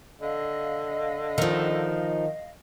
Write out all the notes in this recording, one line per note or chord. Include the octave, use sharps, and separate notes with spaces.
D3 D#5 F5
D#3 F3 D#4